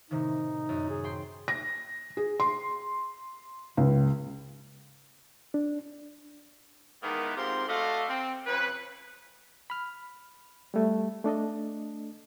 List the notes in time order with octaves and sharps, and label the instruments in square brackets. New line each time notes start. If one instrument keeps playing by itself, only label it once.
[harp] A2 C3 D#3 [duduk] D#4
[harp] F#2
[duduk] G#4
[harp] G5 C6
[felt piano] A#6
G#4
C6
C#2
[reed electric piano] D4
[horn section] D#3 E3 G#3 A#3 B3
G#2 C4 F4 G4 A#4 C6
A3 F#4 A4 D5 D#5 F5
C4
C#3 F3 C4 B4
[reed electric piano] B5 F6
G3 A3
A3 D4 A4 D#5